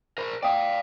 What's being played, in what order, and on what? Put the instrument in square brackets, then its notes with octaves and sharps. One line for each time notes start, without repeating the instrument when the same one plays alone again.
[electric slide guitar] A#4 C5
[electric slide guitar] D5 F5 [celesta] G5 D#6